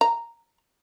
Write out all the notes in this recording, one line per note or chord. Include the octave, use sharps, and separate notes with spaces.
A#5